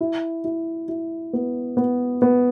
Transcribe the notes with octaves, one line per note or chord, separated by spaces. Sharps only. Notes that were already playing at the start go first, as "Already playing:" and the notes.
E4
E4
E4
B3
B3
B3